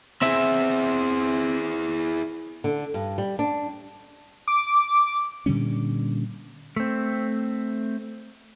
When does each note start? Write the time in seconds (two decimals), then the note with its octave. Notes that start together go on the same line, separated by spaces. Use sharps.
0.22 C4 E4 G#4 E5
2.64 D3
2.94 G2
3.18 G3
3.39 D4
4.48 D6
5.46 A#2 D3 G3 C#4
6.77 A3 C4